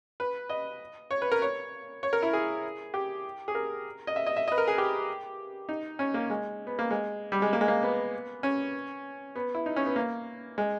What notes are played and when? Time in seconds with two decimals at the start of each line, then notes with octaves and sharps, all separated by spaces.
0.20 B4
0.49 D#5
1.11 C#5
1.22 B4
1.32 A#4
1.42 C#5
2.03 C#5
2.13 A#4
2.22 E4
2.33 G#4
2.94 G4
3.48 G#4
3.55 A#4
4.07 D#5
4.16 E5
4.26 D#5
4.36 E5
4.48 B4 D#5
4.58 A#4
4.67 G#4
4.78 G4
5.69 D#4
5.99 C#4
6.14 A#3
6.30 G#3
6.67 B3
6.79 A#3
6.91 G#3
7.32 G3
7.42 G#3
7.53 A#3
7.61 G#3
7.68 A#3
7.83 B3
8.43 C#4
9.36 B3
9.55 E4
9.66 D#4
9.76 C#4
9.86 B3
9.96 A#3
10.58 G#3